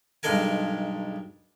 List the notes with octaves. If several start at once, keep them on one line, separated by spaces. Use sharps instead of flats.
B1 G2 G#3 A4 A#4 G#5